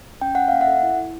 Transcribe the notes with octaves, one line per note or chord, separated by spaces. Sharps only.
C#4 G5
C#4 F#5
A#3 F5
E5 F#5
A4
E4
E4